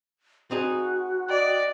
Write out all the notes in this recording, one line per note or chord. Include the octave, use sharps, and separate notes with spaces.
C4 D#4 F#4 G#4
D5 D#5 G5